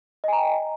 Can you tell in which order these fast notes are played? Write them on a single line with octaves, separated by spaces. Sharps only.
D#5 G#5 A#5 G5